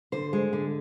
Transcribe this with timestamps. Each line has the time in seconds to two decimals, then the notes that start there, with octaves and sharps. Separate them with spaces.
0.12 D3 C5
0.33 G#3
0.53 D3